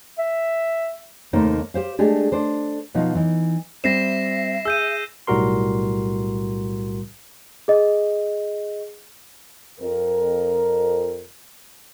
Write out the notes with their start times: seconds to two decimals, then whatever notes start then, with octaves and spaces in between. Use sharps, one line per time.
0.19 E5
1.33 D#2 C3 A3 A#3 D#4 C5
1.74 G4 C5 F5
1.99 G#3 A3 D4 G4 G#4
2.32 D4 A4 C5
2.94 B2 F3 D#4 F4
3.15 E3 D#4
3.84 G3 C4 E5 A#6 C7 E7
4.65 G#4 E6 G6 D#7
5.27 B1 A2 G3 F#4 A#4 C6
7.68 G#4 D#5
9.80 F2 A#4